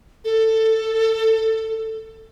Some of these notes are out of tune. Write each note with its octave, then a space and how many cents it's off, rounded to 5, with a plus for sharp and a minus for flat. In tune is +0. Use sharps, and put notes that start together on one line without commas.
A4 +15